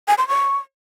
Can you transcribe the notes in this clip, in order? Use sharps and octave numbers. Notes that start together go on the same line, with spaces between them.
G#5
C6
C#6